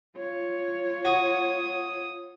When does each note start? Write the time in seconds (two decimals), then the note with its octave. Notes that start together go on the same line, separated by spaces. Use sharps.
0.17 F4 C#5
1.05 F#4 D#6